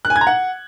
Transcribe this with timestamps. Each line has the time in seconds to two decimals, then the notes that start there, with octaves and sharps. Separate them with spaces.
0.05 F#6
0.10 G#5
0.16 G#6
0.21 A#5
0.27 F#5